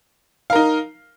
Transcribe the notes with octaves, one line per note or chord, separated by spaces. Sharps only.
D#4 A#4 F5